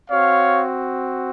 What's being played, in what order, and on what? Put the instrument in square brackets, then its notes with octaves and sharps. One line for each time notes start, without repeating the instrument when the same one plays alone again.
[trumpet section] C4 F#4 C#5 F5